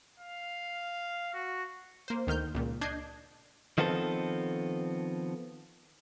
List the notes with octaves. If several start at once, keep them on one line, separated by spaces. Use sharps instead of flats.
F5
F#4
A#3 C5
D2 D#3 F6 G6
C#2 A#2
D4 D#5 G6 G#6 C7
D#3 F3 B3 C4 A4